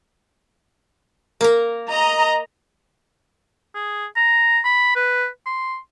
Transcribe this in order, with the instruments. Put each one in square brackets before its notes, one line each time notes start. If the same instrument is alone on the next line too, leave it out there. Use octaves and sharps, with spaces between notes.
[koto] A#3 A#4
[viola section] D#5 A#5
[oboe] G#4
A#5
B5
B4
C6